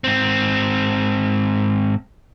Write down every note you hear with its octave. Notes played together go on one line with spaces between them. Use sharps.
G#2 C4